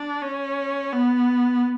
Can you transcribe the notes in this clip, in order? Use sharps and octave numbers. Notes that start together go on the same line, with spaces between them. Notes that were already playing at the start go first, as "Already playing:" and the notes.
Already playing: D4
C#4
B3